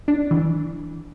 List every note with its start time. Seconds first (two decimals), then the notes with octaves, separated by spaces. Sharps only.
0.08 D4
0.31 E3